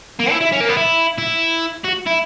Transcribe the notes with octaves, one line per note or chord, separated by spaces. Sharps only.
A#3
E4
E4
C#4
A#3
B3
E4
E4
F#4
E4